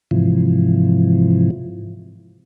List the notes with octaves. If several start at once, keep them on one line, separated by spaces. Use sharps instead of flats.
G#2 C3 E3 F3